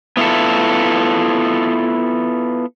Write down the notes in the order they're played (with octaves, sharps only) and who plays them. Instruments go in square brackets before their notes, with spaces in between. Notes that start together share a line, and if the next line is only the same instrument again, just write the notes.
[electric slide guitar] B3 E4 F4 A4